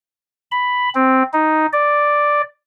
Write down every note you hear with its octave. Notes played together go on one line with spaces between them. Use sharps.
B5
C4
D#4
D5